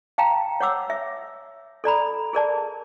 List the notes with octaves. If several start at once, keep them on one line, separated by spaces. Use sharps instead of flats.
F5 G5 A5 A#5
C#5 F#5 D6 E6
E5
A4 D5 A#5 B5
G#4 A#4 D5 A5